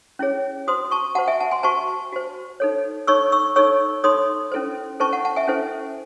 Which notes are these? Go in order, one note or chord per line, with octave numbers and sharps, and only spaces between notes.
C#4 E4 G#4 C#5
F#4 C5 C6 D#6
A5 C#6
F#4 C5 F#5 A5
E5 G#5
F#5 A5
G#5 C6
F#4 C5 A5 C#6
F#4 C5
D#4 A4 C#5
D#4 A4 C#5 C#6 E6
C#6 E6
D#4 A4 C#5 C#6 E6
D#4 A4 C#5 C6 D#6
C#4 E4 A4 C5
C#4 E4 A4 C5 A5 C#6
F#5 A5
F#5 A5
E5 G#5
C#4 E4 A4 C5